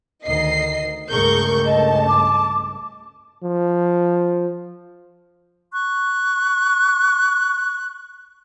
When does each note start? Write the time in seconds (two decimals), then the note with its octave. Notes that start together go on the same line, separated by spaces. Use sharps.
0.25 D2 D#3 D#5 C7
1.10 C#2 G2 A3 G#4 A#4 C#6 G6
1.65 D#5 A5
2.08 D6
3.43 F3
5.72 C#6 F#6